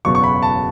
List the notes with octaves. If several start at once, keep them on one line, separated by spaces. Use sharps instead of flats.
F#1 E2 B2 F#3 C#6
C#6
B5
A5